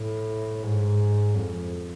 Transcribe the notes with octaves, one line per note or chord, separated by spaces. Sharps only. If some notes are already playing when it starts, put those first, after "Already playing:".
Already playing: A2
G#2
F2